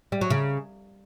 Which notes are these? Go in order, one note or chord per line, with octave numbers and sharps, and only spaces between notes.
G3
F#3
C#3